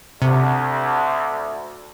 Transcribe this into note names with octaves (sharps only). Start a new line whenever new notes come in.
D2 C3